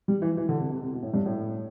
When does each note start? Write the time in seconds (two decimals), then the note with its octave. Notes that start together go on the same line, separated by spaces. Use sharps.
0.08 G3
0.22 E3
0.37 E3
0.49 D3
0.59 C3
0.70 C3
0.81 C3
0.93 B2
1.03 A2
1.14 G2
1.26 A2